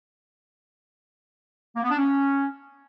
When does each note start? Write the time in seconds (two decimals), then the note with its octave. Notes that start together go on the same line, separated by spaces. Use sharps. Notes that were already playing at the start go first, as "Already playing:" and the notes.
1.76 A#3
1.83 B3
1.90 D4
1.98 C#4